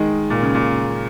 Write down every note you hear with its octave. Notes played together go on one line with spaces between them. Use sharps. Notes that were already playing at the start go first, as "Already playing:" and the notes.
Already playing: D#3 G#3
A#2
C#3
A#2